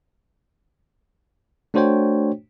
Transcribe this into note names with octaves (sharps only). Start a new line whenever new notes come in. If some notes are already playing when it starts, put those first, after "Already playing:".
A3 D4 F#4 C5 C#5 G5